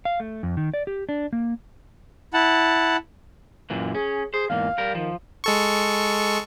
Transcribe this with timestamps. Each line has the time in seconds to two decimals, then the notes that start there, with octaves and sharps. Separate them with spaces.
0.05 F5
0.20 A3
0.43 F2
0.57 D#3
0.74 D5
0.87 G4
1.09 D4
1.33 A#3
2.33 E4 F#5 A5
3.70 F#2 A#2 E3
3.95 C#4 G#4
4.34 G#4 C5
4.50 E2 G#2 A#3 F5
4.78 G3 A#4
4.95 D#3 F3
5.44 G#3 A4 C#6